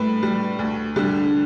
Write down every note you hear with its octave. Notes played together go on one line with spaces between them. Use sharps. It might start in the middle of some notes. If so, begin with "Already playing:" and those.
Already playing: A2 G3 B4
G3
D2
D3 G3